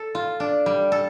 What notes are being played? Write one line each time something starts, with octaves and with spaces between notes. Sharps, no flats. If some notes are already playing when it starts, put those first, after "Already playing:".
Already playing: A4
F4
D4
G3
A4